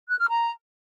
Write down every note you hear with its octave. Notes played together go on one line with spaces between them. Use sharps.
F#6
F6
A#5